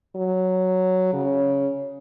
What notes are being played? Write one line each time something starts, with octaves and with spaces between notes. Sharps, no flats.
F#3
C#3